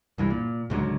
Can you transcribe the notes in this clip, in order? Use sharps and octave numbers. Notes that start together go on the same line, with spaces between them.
C2 G2 E3
A#2
C#2 G#2 D3 F#3